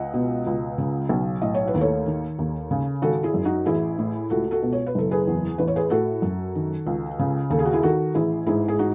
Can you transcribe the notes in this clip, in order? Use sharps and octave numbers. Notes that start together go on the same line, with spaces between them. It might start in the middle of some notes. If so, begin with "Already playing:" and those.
Already playing: C#2 D#5 F#5
B2
C#2
C#3
B1
A2 D#5
C#5
B4
D#2
A4 C#5
D#3
D#2
C#3
G#1 F#4 A4
E4 G#4
F#2
D#4 F#4
A1 E4 G#4
A2
C#2 F#4 A4
F#4 A4
B2
C#5
B4
F#1 A4
G#4 B4
E2
A1 B4
C#5
G#4 B4
A2 F#4 A4
F#2
D#3
C#2
C#3
D#2 A4
G#4
F#4
E4 G#4
D#3 F#4 A4
A1 E4 G#4
G#2 E4 G#4
G#4
D#4 F#4